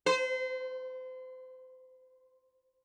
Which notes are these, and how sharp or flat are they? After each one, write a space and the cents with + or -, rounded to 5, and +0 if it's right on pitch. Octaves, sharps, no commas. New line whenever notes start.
C5 -30